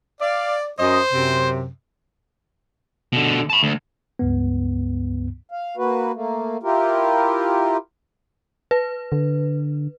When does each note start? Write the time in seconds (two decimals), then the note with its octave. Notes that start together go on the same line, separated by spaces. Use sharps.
0.21 D5 F5
0.79 F#2 C5 D#5
1.12 F#2 C3
3.13 B2 D3
3.50 A5 B5
3.63 D2
4.19 C#2 G2 B3
5.51 F5
5.77 A#3 F#4 B4
6.14 A3 A#3
6.63 E4 F4 G4 A#4
8.71 B4
9.12 D3